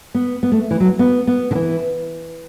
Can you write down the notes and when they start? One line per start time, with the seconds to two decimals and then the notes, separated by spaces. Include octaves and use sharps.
0.15 B3
0.43 B3
0.52 A3
0.71 E3
0.80 F#3
0.99 B3
1.27 B3
1.51 D3
1.55 E3